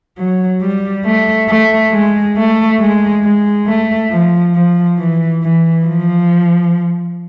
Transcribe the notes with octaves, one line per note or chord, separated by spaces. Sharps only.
F#3
G3
A3
A3
G#3
A3
G#3
G#3
A3
F3
F3
E3
E3
F3